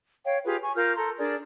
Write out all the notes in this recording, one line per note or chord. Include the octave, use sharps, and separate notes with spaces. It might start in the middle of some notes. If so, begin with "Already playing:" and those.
C#5 F5 G5
F4 G4 G#4 B4
G#5 C#6
F4 A#4 F6 G6
A4 A#5 C6
D4 G#4 A#4 D5